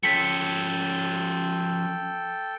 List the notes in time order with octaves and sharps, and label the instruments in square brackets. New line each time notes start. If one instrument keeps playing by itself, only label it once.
[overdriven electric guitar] F3 C#4 [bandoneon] A4 G5 [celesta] B6 C#7